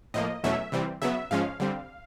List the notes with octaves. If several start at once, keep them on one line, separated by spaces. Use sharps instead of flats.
A2 F3 A#3 D#5
E2 B2 F#3 A3 C#4 E5
C3 E3 G3 C4
C#3 F#3 B3 E5
G#2 F3 G#3 C#4 F5
D3 G3 C4